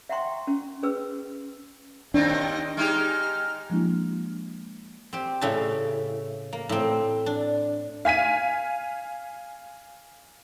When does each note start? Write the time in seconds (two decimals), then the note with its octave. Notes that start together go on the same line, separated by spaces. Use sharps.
0.09 E5 F#5 G5 A#5 C6 C#6
0.47 C#4
0.83 C#4 G#4 B4 E6
2.14 D#2 D#3 C4 D4 D#5
2.77 G#3 D#4 G4 F6
3.70 F3 G#3 A#3 D4 E4 F#4
5.13 C4 G4
5.41 A2 C#3 C#4 E5 A5
6.53 A#3
6.69 A2 C4
7.26 D4
8.05 F5 G#5 B6 D#7